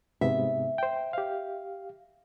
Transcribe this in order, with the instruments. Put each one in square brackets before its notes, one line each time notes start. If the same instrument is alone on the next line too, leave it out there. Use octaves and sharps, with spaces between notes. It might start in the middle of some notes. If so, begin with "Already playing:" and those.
[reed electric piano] G#2 C3 B3 [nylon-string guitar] E5
[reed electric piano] C5 G5
G4 F5